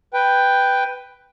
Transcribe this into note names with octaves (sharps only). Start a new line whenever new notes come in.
B4 G5